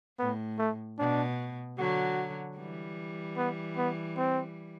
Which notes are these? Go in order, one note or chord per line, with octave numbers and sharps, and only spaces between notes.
A2 B3
A3
B2 D4
D3 F#3 F#4
E3 G3
B3
B3
C4